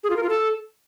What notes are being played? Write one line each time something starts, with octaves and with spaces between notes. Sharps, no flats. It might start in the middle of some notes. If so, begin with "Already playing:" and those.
G#4
F4
A#4
F4
A4